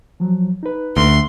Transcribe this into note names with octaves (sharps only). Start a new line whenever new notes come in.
F3 F#3
D#4 B4
D2 C6